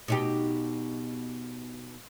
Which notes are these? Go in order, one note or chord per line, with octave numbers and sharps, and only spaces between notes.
B2 D#4 G4